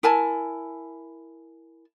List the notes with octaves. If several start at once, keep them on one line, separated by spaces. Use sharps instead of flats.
E4 A#4 G#5 A5